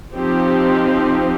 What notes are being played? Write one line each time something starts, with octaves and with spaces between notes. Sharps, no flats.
F3 C4 D#4 G4